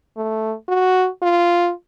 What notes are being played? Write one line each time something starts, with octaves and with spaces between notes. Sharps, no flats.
A3
F#4
F4